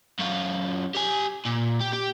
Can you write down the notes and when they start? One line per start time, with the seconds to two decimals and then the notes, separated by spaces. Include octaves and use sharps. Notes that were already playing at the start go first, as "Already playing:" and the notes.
0.19 F#2 F4
0.95 G4 G#5
1.45 A#2
1.81 G4
1.93 G4